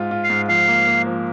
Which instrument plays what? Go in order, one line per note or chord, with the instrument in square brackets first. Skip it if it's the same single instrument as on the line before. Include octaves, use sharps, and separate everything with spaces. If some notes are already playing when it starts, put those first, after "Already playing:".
Already playing: [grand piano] G#2 F4
F4
[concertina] F5
[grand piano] G#2
[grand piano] F3 [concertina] F5
[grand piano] A#3
A#3
F3